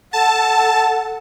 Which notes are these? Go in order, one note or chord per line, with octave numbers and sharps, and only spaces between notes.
A4 F#5 A5